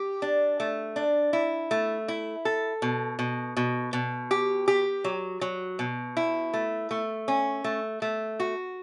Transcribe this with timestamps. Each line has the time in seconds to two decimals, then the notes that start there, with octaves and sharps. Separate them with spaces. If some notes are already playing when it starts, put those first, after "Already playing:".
Already playing: G4
0.22 D4
0.60 A3
0.96 D4
1.33 E4
1.71 A3
2.08 E4
2.45 A4
2.82 B2
3.19 B2
3.57 B2
3.93 B2
4.31 G4
4.68 G4
5.04 F#3
5.41 F#3
5.79 B2
6.17 E4
6.54 A3
6.91 A3
7.28 C#4
7.64 A3
8.02 A3
8.40 F#4